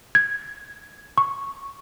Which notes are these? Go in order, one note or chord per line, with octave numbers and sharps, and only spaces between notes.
G#6
C#6